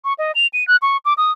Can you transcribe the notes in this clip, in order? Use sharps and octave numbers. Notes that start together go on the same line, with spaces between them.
C#6
D#5
F7
D#7
F#6
C#6
D6
D#6